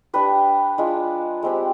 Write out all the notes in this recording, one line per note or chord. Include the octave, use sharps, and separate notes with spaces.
D4 G4 B4
G#3 D4 F4
G#3 C4 G4